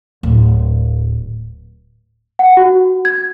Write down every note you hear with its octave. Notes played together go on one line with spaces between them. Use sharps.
D1
F#5
F#4
G#6